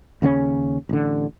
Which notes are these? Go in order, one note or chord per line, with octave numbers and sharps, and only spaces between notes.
D#2 C#3 A#3 C#4
A1 D3